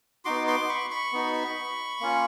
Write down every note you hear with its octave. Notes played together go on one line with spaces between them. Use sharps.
B3 D#4 F#4 C6 D6
C6 D6
B5 C#6
B5 C#6
B3 D#4 F#4
A#3 C#4 F4